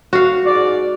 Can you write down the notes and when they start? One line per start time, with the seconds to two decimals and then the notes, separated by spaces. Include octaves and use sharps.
0.13 F#4 F5
0.46 G#2 D5